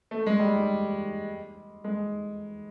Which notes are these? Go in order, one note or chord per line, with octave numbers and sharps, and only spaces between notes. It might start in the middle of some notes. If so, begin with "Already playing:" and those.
A3
G#3
G3
G3
G#3